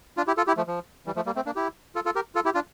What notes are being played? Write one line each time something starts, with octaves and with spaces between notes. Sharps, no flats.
D4 F4
E4 G4
F4 A4
E4 G4
F3 A3
F3
E3 G3
F3 A3
G3 A#3
A3 C4
A#3 D4
E4 G4
F4 A4
F4 A4
G4 A#4
F4 A4
E4 G4
D4 F4